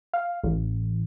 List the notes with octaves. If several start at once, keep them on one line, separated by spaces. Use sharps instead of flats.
F5
A1